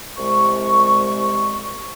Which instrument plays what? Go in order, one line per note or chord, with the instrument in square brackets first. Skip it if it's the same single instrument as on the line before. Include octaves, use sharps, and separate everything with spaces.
[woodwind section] C2 G#3 C#6